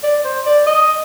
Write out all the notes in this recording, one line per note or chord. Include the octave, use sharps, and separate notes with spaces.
D5
C5
D5
D#5